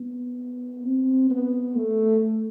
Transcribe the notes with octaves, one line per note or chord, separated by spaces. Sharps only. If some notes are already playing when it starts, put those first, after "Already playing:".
Already playing: B3
C4
B3
A3